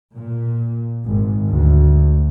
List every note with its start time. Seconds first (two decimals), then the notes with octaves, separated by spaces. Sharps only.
0.15 A#2
1.06 G#1
1.49 D2